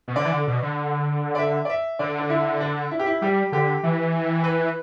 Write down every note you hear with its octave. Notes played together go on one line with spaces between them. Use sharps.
B2
D3 D5
E3
D3
B2
D3
D5
E5
D5
E5
D3 D5
D4
E4
D4
E4
G4
E4
G3 G4
D3 G4
E3
B4